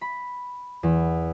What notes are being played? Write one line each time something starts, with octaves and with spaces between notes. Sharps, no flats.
B5
E2